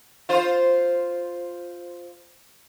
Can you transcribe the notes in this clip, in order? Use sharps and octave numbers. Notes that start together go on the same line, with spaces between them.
F4 C5